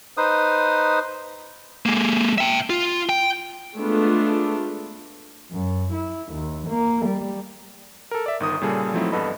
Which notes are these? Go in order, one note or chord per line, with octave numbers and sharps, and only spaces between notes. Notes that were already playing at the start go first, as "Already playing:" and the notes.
D#4 B4 C5 D#6
G#3 A#3
E5 G5
F4
G5
G#3 A3 B3 D4 F4
F#2
E4
D#2
A#3
G3
A4 A#4
D5 E5
G1 D#3 D#6
A#2 C#3 G3 G#4 A4
F3 F#3 A3 C4 D#4 E4
E2 G2 B3 A4 D#5 B5